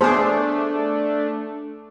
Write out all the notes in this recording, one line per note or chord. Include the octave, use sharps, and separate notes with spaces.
A3 B3 D4 G#4 C5